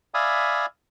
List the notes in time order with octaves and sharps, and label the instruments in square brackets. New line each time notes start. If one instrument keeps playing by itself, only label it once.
[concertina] D5 E5 F5 G#5 B5 D#6